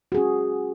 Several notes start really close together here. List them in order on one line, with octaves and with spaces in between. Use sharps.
F#4 G#4 C#4